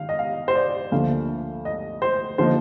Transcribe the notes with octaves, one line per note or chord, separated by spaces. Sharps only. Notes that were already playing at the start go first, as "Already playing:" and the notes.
Already playing: D#3 F5
D#5
F5
C5
D5
D2 D3 F3 A#3 F5
D#5
C5
D3 F3 A#3 D#4 C5